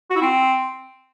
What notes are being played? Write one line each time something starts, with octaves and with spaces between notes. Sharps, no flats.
F#4
E4
C4